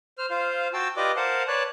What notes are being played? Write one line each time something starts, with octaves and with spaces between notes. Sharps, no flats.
C5 F6
F4 C5 F5
F#4 G5 A5 E6
F4 G4 B4 D5 D#5 D6
A#4 C5 F5 F#5 A5
B4 C#5 D5 A5 F#6